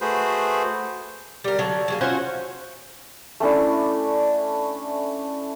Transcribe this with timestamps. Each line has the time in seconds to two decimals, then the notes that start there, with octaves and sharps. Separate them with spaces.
0.01 A3 F#4 G#4 B4 C5
1.44 G3 A#4
1.59 D3 F#3
1.88 F#3 G#3 A#3
2.01 C#4 F4 F#4 C5
3.40 A3 C#4 D4 E4